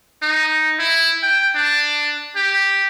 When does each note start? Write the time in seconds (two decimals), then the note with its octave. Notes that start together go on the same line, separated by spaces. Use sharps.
0.22 D#4
0.79 E4
1.22 G5
1.55 D4
2.36 G4